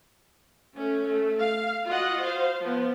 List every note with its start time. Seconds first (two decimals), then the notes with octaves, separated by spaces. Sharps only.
0.77 A3 C#4
1.07 A3
1.38 F5
1.87 F4 F#4 D#5 F#5
2.21 C5 F5
2.60 F3 B3